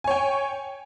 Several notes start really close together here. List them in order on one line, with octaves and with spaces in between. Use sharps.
G#5 C#5 G5